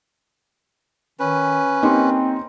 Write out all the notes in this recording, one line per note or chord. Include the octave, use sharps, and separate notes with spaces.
D#3 C#4 B4
A#3 C4 D#4 G4